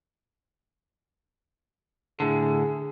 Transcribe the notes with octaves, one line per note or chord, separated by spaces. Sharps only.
A2 D3 G#4